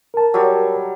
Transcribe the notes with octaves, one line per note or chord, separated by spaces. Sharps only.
A#4 A5
F#3 G3